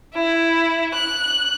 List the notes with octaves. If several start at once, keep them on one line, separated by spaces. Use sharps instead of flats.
E4
F#6